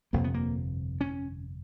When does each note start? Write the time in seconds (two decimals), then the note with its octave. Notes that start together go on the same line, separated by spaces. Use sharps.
0.13 G1 F2 C3 A#3
0.24 B3
0.34 A#3
1.01 C#4